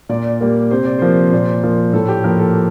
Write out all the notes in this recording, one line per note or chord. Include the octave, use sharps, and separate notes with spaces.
A#2 D5
G3 A#3
C3 C5
D5
F3 A#3 C5
A#2
F3 A#3
A2 A4
G4
F3 A#3 A#4
A4